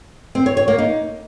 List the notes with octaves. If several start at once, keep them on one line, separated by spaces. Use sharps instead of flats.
C4
C#5
C#5
A#3
D#4